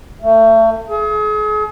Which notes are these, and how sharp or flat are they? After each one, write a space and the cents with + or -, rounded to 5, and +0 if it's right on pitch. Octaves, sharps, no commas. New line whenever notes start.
A3 +30
G#4 +35